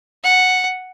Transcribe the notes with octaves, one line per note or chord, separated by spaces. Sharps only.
F#5